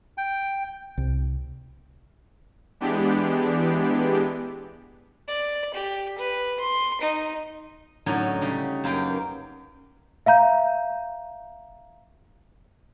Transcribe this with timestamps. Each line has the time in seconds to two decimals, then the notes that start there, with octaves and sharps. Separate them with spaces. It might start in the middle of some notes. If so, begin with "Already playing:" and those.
0.18 G5
0.98 C2
2.80 E3 G#3 B3 D4 G4
5.28 D5
5.74 G4
6.18 B4
6.60 C6
7.01 D#4
8.06 A2 D3 F#3 C#4 D#4
8.41 C#3 G3 C#4
8.84 F#2 A#3 B4 G5
10.26 E5 F5 A#5 G6